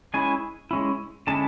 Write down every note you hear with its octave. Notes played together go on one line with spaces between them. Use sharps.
G#3 C#4 E4 G#5
G#3 C#4 E4
D3 G#3 C#4 E4 A5